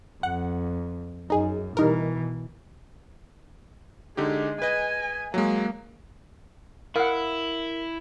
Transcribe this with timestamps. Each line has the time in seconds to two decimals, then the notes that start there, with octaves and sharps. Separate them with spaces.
0.23 F2 F#5
1.30 F#2 D#4 G#4
1.77 B2 E3 G3 D#4 A#4
4.17 D3 G#3 D#4 G4
4.62 B4 D#5 G#5
5.34 F#3 G#3 A#3
6.96 E4 A#4 F5 F#5